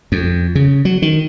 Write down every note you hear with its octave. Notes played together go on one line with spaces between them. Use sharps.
F2
C#3
F#3
D#3